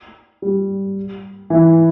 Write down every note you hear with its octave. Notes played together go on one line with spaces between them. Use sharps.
G3
E3